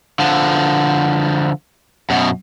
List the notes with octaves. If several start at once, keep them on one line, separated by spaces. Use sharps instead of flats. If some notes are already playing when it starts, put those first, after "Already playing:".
D3 F3
F#2 B2